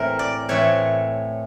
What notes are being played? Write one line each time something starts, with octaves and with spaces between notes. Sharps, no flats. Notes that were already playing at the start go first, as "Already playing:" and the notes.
Already playing: A2 E3 A3 C4 A#4
D5
A2 E3 A3 C4 C#5